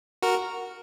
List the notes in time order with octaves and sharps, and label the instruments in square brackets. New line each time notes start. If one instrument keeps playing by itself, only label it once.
[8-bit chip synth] F#4 A#4